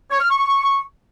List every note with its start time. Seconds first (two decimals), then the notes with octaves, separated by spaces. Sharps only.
0.11 C#5
0.21 F6
0.30 C#6